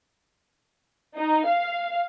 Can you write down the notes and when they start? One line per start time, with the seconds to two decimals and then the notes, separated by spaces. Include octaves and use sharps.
1.17 D#4
1.46 F5